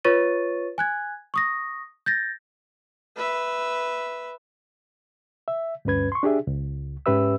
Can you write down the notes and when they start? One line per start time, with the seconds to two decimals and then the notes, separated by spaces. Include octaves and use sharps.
0.04 F4 B4 C#5 C#6 A6 D#7
0.78 G#5 F#6 G#6
1.34 C#6 D#6 A#6
2.06 G6 A6 A#6
3.16 B4 E5
5.48 E5
5.85 D2 G2 C#4 B4 G#6
6.12 C6 C#6
6.23 D4 G4 G#4 E5
6.47 C#2
7.06 G#2 C#4 G4 B4 E5 E6